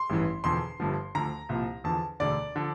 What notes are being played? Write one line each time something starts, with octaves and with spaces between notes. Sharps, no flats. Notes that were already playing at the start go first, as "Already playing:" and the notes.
Already playing: C6
A1 G2 E3
E1 E2 D3 F3 C6
G1 G2 D3 F3
D2 D3 F3 A#5
C2 A#2 F3
E2 D3 F3 A5
E1 D2 D3 D5
D3 F3